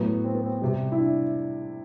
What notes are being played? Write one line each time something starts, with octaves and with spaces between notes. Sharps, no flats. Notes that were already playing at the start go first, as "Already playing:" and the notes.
Already playing: A2 F#3 B3
C4
B3
C4
C3 G3
E4
D4